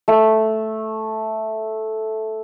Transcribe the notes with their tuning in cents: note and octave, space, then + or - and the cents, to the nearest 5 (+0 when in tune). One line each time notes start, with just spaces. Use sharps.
A3 -5